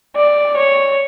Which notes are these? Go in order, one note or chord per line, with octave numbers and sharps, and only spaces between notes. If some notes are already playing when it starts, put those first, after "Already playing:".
D5
C#5